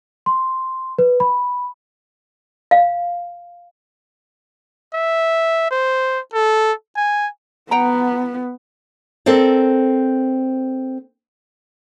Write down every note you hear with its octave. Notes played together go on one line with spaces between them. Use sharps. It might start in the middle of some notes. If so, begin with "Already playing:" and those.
C6
B4
B5
F5
E5
C5
A4
G#5
B3 F#5 G5 A#5
C4 A4 A#4 C5 D5